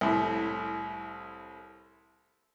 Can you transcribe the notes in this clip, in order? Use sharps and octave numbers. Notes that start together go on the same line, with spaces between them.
C2 A2